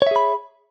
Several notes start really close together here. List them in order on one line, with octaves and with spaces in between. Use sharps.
C#5 E5 G#4 B5